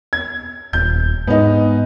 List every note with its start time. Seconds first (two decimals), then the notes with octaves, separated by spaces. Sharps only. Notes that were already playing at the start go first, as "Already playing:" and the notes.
0.13 G#6
0.73 D#1 G6
1.27 G#2 B3 D#4